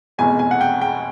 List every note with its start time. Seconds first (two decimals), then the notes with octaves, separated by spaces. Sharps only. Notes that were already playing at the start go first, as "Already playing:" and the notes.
0.18 F1 E2 B2 G#3 G#5
0.39 G#5
0.51 F#5
0.61 G5
0.81 G5